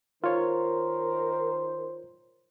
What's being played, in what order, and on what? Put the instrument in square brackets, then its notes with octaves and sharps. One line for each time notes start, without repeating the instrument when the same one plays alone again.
[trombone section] D#3 C5 [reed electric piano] F4 C#5 [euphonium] A#4